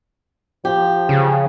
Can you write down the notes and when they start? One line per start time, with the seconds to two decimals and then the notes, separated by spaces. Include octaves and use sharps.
0.65 F3 G4
1.09 C#3